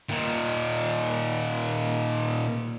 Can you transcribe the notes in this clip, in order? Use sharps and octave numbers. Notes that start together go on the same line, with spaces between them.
A#2 D#3